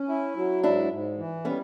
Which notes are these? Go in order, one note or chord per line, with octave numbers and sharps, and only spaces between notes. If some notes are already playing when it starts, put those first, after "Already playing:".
Already playing: C#4
E4
F#3
G#2 D4 E4
G#2
E3
G3 B3 C#4